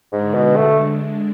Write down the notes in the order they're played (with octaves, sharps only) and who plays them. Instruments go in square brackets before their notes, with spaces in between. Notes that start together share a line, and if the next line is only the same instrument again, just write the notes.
[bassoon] G#2 [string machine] D3 G#3 D4
[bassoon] B2
A3